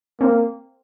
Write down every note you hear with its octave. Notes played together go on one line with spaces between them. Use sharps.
A#3 C4